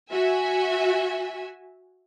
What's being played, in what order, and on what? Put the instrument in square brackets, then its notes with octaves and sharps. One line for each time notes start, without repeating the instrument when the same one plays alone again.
[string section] F#4 E5 G#5